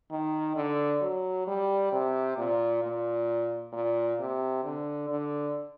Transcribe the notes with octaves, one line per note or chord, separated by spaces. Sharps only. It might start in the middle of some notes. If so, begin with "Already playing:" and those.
D#3
D3
F#3
G3
C3
A#2
A#2
A#2
C3
D3
D3